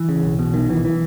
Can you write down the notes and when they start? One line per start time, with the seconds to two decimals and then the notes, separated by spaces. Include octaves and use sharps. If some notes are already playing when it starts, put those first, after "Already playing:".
Already playing: E3
0.09 C#3
0.23 B1
0.39 B2
0.54 B1 D#3
0.69 B1 E3
0.85 E3